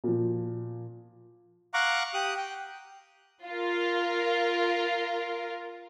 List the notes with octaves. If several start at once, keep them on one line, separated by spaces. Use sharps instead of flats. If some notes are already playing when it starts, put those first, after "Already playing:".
A#2 F3
F5 F#5 A#5 C#6 D6 F#6
G4 D#6 F#6
G5
F4 A#4